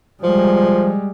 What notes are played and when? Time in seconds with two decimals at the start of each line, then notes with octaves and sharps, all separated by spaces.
0.23 F3 G3 G#3